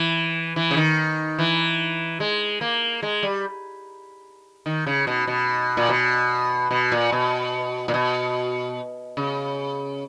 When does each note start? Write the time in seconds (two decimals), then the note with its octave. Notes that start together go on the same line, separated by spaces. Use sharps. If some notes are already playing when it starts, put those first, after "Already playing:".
Already playing: E3
0.56 E3
0.71 C#3
0.77 D#3
1.39 E3
2.20 G#3
2.61 A#3
3.02 G#3
3.23 G3
4.66 D#3
4.86 C#3
5.07 B2
5.27 B2
5.77 A#2
5.89 B2
6.71 B2
6.92 A#2
7.12 B2
7.88 A#2
7.94 B2
9.17 C#3